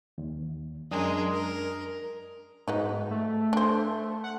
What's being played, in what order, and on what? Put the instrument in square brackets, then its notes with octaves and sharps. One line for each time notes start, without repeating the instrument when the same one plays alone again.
[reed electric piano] D#2
[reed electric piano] F#2 D4 D#6 [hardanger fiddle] G#3 A#4
[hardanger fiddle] A#4
[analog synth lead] G#2 [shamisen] F#3 B3 D#4
[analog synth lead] A3
[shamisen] D4 C5
[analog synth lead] F#5